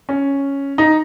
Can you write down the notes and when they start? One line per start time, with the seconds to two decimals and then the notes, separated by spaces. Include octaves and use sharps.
0.09 C#4
0.78 D#4